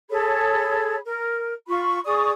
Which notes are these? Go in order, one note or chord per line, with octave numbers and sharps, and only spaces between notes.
G#4 A4 C#5 B5
A#4
F4 B5 C#6
G#4 D5 C#6 D#6